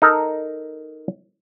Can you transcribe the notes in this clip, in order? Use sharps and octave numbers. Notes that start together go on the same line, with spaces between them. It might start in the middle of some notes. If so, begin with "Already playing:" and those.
D#4 A4 A#4